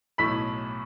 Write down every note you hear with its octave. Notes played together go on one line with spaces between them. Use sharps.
B1 A2 E3 A3 B5 B6